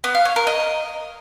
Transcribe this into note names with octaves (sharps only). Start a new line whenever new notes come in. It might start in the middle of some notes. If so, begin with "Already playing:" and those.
B3
F5
C#5
A#4
D#5